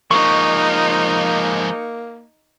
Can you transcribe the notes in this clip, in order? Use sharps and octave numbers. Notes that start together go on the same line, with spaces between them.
F3 G#3 A#3 D#4 C#6